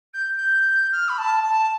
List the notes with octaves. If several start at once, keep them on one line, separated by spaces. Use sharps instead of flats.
G6
G6
F6
B5
A5
A5